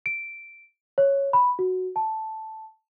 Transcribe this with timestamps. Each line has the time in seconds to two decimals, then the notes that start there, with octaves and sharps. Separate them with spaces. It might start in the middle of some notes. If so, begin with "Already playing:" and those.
0.06 D7
0.98 C#5
1.33 B5
1.59 F#4
1.96 A5